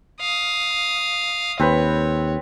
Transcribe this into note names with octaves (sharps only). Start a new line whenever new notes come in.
F5 D#6
D#2 C4 B4 C#5 B5